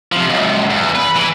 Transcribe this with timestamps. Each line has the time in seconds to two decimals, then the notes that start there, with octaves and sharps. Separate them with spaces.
0.12 C3 F3
0.30 C#2 F#2
0.70 E2
0.95 B4
1.16 E3